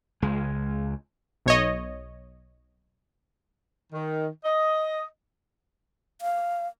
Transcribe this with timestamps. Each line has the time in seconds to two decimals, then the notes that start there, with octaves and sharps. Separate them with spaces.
0.22 C#2 G#3
1.46 B1 C#5 D#5
3.93 D#3
4.45 D#5
6.22 F5